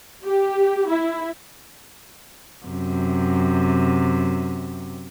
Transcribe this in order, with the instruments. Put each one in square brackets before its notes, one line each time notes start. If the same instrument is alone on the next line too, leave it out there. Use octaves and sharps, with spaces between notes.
[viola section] G4
E4
[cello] F#2 C3